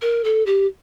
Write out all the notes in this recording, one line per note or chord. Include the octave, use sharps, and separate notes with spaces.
A#4
A4
G4